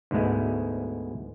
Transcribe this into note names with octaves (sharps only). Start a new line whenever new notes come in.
D2 G#2 B2 G#3 A3